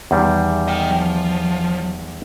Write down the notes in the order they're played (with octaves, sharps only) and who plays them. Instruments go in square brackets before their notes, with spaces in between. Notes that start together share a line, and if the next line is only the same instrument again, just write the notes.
[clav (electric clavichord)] E2 D#3 G3
[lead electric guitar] D#5 G5
F3